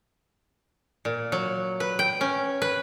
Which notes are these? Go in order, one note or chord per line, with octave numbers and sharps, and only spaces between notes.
A#2
F#3
B4
G5
C#4
B4